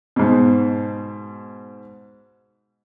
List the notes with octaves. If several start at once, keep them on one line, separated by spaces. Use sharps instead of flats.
G#2 B2